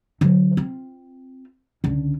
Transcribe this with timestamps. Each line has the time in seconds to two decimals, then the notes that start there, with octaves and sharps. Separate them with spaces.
0.21 D3 F#3
0.57 C4 F4
1.84 C#2 D3